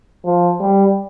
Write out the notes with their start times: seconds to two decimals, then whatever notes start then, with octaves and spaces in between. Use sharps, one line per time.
0.25 F3
0.60 G3